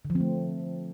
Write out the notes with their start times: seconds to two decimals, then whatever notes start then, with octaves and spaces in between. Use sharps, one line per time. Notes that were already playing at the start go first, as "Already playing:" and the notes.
0.05 D3
0.10 F3
0.15 C4
0.20 A3